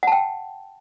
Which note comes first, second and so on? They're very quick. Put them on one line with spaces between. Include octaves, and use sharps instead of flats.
F#5 A5 G5